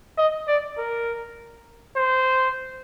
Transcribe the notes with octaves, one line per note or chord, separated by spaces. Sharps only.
D#5
D5
A#4
C5